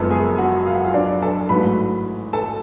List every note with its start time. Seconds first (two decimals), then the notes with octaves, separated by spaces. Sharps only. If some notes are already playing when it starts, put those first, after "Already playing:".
Already playing: F#1 F#2 F3 G#3 B3 A4
0.10 G#4 G#5
0.38 F#4 F#5
0.66 F5
0.75 F#5
0.84 F4 F5
0.94 D4 D5
1.22 A4 A5
1.49 A1 G#2 F#3 A3 B4 B5
2.33 A4 A5